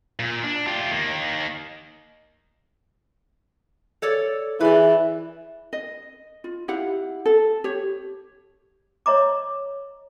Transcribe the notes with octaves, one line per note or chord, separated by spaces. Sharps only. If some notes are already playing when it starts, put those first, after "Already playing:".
A#2
D4
F4 G4
D#3 A#3
A4 C#5 D5
E3 E4 G#4 B4 D5
D#5
F4
E4 G4 F5 F#5
A4
G4 C#5
C#5 D#5 A#5 D6